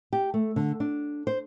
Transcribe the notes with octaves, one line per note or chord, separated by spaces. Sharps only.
G4
A3
D3
D4
C5